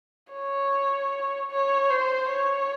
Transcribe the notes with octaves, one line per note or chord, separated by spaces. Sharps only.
C#5
C#5
C5
C#5